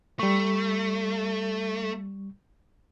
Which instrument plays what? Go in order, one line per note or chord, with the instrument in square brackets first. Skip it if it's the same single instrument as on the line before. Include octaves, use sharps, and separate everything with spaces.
[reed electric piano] G3 C#6 [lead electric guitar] A3